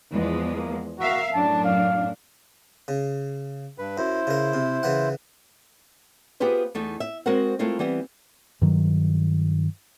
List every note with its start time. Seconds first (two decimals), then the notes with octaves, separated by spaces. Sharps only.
0.12 E2 F3 G#3
0.57 A#3
0.99 F#4 A#4 E5 F5
1.33 F#2 A2 D4 A5
1.64 F5
2.88 C#3
3.78 G2 B4
3.98 F#2 E4 C5
4.27 C#3 A#4
4.53 C3
4.83 C#3 E3 F#5
6.40 B3 F4 G4 G#4 B4 C5
6.75 E2 A3 D#4
7.00 E5
7.26 G#3 C4 F#4 A#4 C5 F#5
7.59 G#3 A3 C4 E4 F4 A#4
7.79 E3 G3 B3 C4
8.62 G2 D#3 F#3